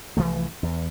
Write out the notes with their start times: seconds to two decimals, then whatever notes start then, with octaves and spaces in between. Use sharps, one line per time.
0.17 C2 E3 F3 A3
0.63 E2